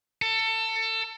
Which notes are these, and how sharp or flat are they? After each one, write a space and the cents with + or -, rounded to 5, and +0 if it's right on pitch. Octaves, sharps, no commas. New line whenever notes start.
A4 +25